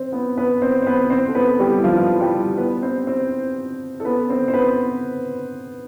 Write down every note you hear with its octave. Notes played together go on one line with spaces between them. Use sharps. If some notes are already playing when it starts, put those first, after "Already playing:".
Already playing: C4 C5
B3 B4
B3 B4
C4 C5
C5
B3 B4
C4 C5
A4
B3 B4
G3 G4
E4
F3 F4
G3 G4
B3 B4
C4 C5
C4 C5
A4
B3 B4
C4 C5
C5
B3 B4